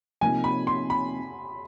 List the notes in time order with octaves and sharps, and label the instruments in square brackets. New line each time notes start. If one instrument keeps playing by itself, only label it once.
[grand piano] C3 F3 A#3 D#4 [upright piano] G#5
[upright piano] B5
C6
B5